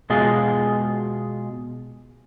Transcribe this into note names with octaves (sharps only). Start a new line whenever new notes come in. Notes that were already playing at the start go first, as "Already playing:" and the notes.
B2 G#3 F4 G#4